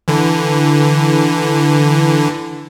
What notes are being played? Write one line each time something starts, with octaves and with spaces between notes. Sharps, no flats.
D3 E3